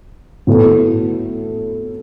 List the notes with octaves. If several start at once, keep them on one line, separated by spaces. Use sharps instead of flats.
A2 F#3 B3 E4 A4